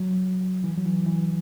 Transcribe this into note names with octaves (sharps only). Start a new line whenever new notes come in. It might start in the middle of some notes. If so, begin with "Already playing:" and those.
Already playing: F#3
E3
F#3
E3
E3